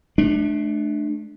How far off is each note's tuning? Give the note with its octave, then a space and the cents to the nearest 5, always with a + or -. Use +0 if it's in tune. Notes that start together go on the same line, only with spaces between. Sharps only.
A3 -30 D4 +15